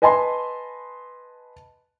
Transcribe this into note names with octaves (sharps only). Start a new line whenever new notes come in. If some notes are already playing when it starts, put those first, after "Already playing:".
B4 D#5 G#5 A5 B5 C6